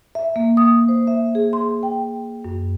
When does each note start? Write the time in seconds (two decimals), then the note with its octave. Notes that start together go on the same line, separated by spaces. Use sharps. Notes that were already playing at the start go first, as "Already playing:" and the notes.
0.15 E5
0.36 A#3
0.57 D#6
0.89 C5
1.07 E5
1.35 G#4
1.53 C6
1.83 G5
2.45 F#2